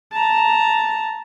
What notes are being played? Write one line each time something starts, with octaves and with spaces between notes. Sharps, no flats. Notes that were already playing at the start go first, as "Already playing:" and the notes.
A5 A#5